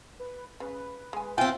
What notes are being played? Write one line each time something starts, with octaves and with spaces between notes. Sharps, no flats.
B4
C#3 B4
G#3 G#5
C4 F4 E5 G5 G#5